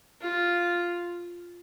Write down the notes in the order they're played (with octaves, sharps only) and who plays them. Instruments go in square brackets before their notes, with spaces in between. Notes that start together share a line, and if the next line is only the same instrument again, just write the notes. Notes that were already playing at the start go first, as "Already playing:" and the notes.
[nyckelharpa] F4